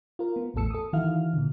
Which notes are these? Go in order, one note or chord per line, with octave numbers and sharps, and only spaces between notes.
F4 A#4
B3
A1 E2 A2 A4 E6 C#7
A4 D#6
D#3 E3 E4 F#4 F5 F6
A#2 D3